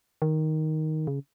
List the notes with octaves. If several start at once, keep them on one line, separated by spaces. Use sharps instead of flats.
D#3
C#3